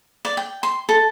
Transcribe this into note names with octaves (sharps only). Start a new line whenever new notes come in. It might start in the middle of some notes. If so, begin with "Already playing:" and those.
D5
G5
C6
A4